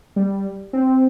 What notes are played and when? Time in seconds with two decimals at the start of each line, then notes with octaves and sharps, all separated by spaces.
0.16 G3
0.73 C4